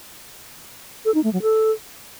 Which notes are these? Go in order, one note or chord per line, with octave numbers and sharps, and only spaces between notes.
A4
D#4
A3
F#3
A4